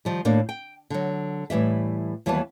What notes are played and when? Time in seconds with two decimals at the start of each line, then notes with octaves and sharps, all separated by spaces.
0.05 D#3 F3 G3
0.25 D#2 A2 A#3 D4
0.49 G5
0.90 D3 F#3
1.50 A2 E3 G3 E5
2.26 D#2 E3 F#3 G3 B3 A5